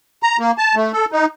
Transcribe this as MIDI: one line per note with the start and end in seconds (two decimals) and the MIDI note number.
0.23 0.37 82
0.39 0.51 58
0.58 0.75 81
0.75 0.92 57
0.93 1.05 69
1.12 1.25 63